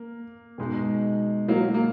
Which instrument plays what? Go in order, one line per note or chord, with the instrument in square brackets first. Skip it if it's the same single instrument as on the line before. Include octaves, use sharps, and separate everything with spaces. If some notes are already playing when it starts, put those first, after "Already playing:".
Already playing: [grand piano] A#3
B2 G#3 D#4
[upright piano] F#3 A#3
A#3